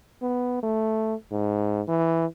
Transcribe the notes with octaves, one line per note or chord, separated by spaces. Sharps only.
B3
A3
G#2
E3